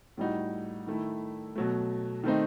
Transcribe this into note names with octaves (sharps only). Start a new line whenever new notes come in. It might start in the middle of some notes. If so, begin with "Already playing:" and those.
A2 G3 D#4 F#4
D#3 A3 E4
B2 F#3 A3
D#3 A3 C4 D#4